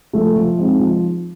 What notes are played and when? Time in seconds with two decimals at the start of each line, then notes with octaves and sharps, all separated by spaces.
0.13 F3 A3
0.36 F3
0.58 G#3 C4 D#4
0.80 F3